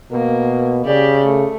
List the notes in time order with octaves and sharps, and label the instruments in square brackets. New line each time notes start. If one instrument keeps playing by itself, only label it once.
[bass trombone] B2 [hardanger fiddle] A#3
[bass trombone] C#3 [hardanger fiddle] G4 D5
[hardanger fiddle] A3